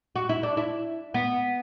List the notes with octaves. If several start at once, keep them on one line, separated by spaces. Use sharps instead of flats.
F#4
E4
D4
E4
B3